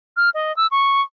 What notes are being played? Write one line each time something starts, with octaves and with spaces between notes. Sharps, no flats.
F6
D#5
E6
C#6